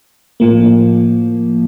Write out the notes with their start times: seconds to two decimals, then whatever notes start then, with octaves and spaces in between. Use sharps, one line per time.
0.40 A2 F3 A#3